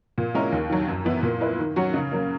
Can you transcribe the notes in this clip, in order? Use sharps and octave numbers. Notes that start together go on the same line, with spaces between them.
A#2
G#3 C#4 E4 A#4
D#2
D#3 F#3
F#2
E3 B3 E4
A#2
A#3 E4 B4
D#3
F#3 C#4 F#4
C#3
F#3 A#3